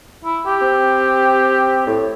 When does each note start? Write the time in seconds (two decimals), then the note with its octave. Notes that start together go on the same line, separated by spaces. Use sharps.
0.25 E4
0.46 G4
0.62 C4
1.87 A2